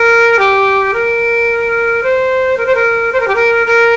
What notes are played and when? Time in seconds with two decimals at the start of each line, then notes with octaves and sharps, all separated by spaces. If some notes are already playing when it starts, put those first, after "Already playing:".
Already playing: A#4
0.38 G4
0.93 A#4
2.03 C5
2.57 A#4
2.66 C5
2.74 A#4
3.12 C5
3.19 A#4
3.27 G4
3.34 A#4
3.66 A#4